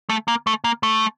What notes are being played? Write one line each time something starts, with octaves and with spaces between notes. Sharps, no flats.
A3
A#3
A3
A#3
A3